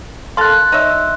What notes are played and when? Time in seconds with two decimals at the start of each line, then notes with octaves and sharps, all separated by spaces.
0.37 A#3 A4 F5 C6 F#6
0.72 D#4 C#5 E5